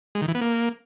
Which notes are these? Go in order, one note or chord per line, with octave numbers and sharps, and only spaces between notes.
G#3
D#3
E3
B3
A#3